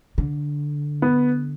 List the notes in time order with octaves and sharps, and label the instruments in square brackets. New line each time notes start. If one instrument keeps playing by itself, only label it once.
[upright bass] D3
[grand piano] B3